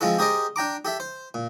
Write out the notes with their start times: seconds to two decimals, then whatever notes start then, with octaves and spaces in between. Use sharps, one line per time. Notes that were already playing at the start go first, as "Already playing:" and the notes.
0.01 F3 G#3 C4 F4 A4
0.19 G4 G#4 A#4 C5 D5 D#5
0.56 D4 G5 A#5 D6
0.85 G4 A4 E5
1.00 C5
1.34 A#2